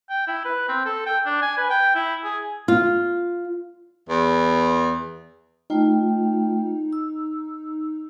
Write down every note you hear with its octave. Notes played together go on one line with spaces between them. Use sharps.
G5
E4
B4
C4
A4
G5
D4
G#5
B4
G5
E4
G#4
F4
E2
A3 D#4 F4 G5
E6